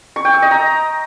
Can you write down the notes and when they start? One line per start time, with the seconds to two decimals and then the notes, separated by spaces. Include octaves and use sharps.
0.16 C#6
0.25 G5
0.34 E5
0.42 D#5
0.51 A#5